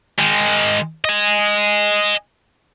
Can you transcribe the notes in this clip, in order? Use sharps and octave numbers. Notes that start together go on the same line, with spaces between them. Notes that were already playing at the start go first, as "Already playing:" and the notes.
D#3 G#3
D#5 G#5